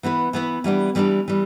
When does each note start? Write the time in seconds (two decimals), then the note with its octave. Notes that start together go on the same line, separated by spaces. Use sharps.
0.03 E3 B3 E4 B4
0.33 E3 B3 E4 B4
0.64 E3 G3 B3 D4
0.95 E3 G3 B3 D4
1.28 E3 G3